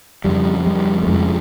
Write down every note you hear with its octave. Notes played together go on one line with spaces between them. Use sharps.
F2 C#3 G3
G3
A3
F2 C#3 G#3